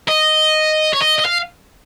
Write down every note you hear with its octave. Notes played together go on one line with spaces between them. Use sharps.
D#5
C#5
D#5
D#5
F5